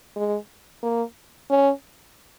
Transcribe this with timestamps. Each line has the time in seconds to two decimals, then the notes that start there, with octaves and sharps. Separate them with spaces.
0.16 G#3
0.83 A#3
1.50 C#4